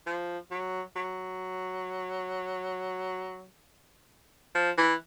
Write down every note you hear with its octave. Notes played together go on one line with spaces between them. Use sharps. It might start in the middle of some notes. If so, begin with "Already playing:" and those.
F3
F#3
F#3
F3
E3